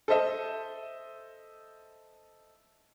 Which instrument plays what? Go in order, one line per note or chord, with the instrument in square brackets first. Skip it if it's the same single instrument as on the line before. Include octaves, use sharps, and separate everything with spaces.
[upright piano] A4 C5 D#5 E5